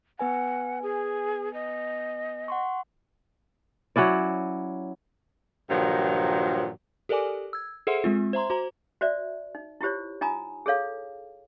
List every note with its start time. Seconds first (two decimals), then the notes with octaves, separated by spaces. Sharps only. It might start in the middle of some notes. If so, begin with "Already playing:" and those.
0.19 B3 B4 F#5 G#5
0.82 G#4
1.54 D#5
2.48 F#5 C6 C#6
3.96 F#3 C#4 E4 D5
5.70 G2 A#2 D#3 F3 F#3
7.09 G4 A4 A#4 D5 G#5 D6
7.53 E6 G#6
7.87 G#4 A4 C5 E5 F#5 C6
8.04 G#3 C4 F4
8.33 C5 E5 A#5 C6
8.50 F#4 C5 A#5
9.01 F#4 C5 D5 E5
9.55 D#4
9.81 E4 F4 G4 C5 C#5
10.21 D#4 F4 G#5 A#5 D#6
10.66 G#4 A4 C#5 F5